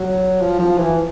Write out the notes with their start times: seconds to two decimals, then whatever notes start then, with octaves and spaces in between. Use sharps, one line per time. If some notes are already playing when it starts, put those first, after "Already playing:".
Already playing: F#3
0.41 F3
0.59 F3
0.78 E3